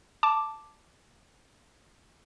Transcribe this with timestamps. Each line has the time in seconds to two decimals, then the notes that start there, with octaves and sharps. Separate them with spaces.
0.23 A5 D6